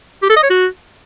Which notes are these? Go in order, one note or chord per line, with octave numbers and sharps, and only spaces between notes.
G4
A4
D#5
C#5
F#4